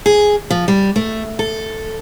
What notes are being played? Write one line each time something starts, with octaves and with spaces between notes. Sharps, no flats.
G#4
F3
G3
A3
A4